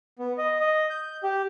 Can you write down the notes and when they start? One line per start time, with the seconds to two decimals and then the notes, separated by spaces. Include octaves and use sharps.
0.19 B3
0.38 D#5
0.61 D#5
0.90 G6
1.23 G4